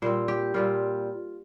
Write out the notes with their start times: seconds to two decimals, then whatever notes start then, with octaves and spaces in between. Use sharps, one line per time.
0.02 A#2 G3 C4 C5
0.28 G4
0.54 A#2 G3 C4 F4